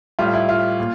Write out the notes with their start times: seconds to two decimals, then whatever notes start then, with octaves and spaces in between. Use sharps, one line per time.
0.19 A2 G3 F4
0.34 E4
0.49 F4
0.80 A#2